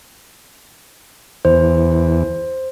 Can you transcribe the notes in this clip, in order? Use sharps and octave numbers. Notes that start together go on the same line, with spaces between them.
E2 C5